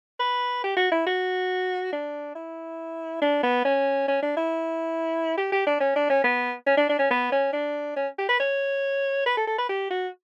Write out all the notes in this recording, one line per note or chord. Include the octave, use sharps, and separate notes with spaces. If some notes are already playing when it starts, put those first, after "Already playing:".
B4
G4
F#4
E4
F#4
D4
E4
D4
B3
C#4
C#4
D4
E4
G4
G4
D4
C#4
D4
C#4
B3
C#4
D4
D4
C#4
B3
C#4
D4
C#4
G4
B4
C#5
B4
A4
A4
B4
G4
F#4